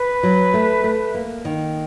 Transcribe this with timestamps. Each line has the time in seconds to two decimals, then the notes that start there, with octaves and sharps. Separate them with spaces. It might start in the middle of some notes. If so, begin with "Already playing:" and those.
Already playing: B4
0.23 F#3
0.54 A3
0.84 A3
1.14 A#3
1.45 D#3